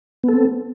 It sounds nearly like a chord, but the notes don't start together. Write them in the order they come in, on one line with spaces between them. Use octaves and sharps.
B3 A4 C4